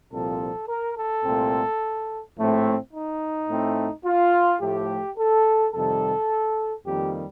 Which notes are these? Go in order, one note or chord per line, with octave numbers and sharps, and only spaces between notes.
C2 A#2 F3 C4 A4
A#4
A4
C2 A#2 A3 C4
A#1 A2 A3 C4
D#4
A2 A3 C4
F4
A2 F3 A3 G4
A4
F2 C3 D#3 G3 A4
F2 D#3 G3 A#3 G4